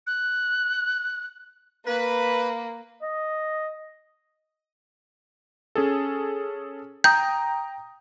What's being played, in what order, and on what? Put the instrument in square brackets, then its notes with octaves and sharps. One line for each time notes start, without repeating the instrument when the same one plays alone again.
[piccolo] F#6
[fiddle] A#3 [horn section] B4
[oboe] D#5
[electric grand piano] C#4 G#4 A4
[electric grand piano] G5 A#5 D#6 [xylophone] G6